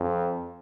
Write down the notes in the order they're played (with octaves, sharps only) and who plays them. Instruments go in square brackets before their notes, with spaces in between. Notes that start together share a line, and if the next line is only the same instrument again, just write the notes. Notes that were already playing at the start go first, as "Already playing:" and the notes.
Already playing: [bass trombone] F2